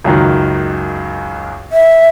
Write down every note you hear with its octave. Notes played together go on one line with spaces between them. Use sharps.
C#2 F#2 D#3
E5